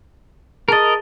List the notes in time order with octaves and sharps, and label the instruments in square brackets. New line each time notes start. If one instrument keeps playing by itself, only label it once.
[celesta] G#4 A5 A6 [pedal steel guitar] A#4 D#5